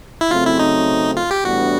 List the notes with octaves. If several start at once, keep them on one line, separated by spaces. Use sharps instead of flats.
E4
C#3 F#3 A3 C4 F4
E4
D#4
F4
G4
A2 E3 G3 B3 D4 F#4